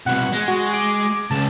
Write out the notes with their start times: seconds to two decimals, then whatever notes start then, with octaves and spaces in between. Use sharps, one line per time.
0.06 C2 B2 F#5
0.33 G#3
0.48 F#4
0.73 D6
1.31 C#2 A5